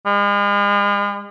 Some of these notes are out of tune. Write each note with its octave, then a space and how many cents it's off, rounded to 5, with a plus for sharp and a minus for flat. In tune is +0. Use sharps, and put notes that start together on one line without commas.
G#3 -40